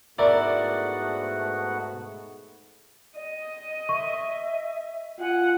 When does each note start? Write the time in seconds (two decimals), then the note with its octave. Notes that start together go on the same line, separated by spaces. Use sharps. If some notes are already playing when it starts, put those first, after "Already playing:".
0.19 G#2 A3 B3 E4 F#4 A#4 D5 F#5
3.16 D#5
3.89 E5 C#6
5.20 F4 F#5 G#5